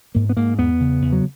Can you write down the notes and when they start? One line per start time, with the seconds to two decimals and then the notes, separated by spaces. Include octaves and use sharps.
0.15 G#2 A#3
0.29 B3
0.36 G#2 A#3
0.58 E2 B3
0.80 C#3
1.02 E2
1.12 F#3